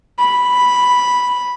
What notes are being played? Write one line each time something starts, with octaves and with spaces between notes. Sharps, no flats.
B5